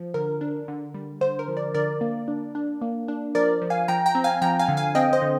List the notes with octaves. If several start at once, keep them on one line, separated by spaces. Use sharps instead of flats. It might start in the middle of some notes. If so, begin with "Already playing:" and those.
Already playing: F3
D3 A#4
D4
D3
G3
D3 C5
A#4
F3
A#4 D5
D3 A#4 D5
A#3
D4
D4
A#3
D4
F3 A#4 D5
F3
F5 G#5
F3 G5 A#5
G5 A#5
C4
F5 G#5
F3 G5 A#5
F5 G#5
D3
F5 G#5
C4 D#5 G5
C5 D#5
D3